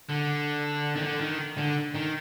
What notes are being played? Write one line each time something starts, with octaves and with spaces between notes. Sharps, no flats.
D3
D#3
D3
D#3
D3
D#3